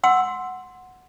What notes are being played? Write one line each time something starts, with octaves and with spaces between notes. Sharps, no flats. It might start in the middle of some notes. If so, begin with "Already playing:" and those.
F#5 C6 E6